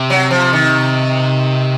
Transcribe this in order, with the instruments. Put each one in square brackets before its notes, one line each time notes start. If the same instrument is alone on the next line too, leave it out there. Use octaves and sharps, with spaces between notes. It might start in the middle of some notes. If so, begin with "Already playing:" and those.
Already playing: [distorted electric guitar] C3
[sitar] F#3
F3
D#3